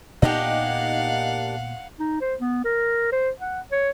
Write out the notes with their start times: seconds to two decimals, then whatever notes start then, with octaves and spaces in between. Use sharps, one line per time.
0.22 A#2 A#3 B3 D4 D#4 G4 F5 F#5
2.00 D#4
2.21 C5
2.40 B3
2.65 A#4
3.12 C5
3.40 F#5
3.72 C#5